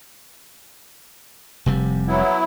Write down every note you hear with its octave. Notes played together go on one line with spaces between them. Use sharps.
F1 C3 G3
F#3 B3 E4